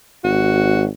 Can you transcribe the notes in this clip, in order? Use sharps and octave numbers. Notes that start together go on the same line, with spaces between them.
G#1 F#4